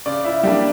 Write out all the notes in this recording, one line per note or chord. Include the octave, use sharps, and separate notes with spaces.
C#3 D5
E4 E5
G3 A#3 D4 G4 G5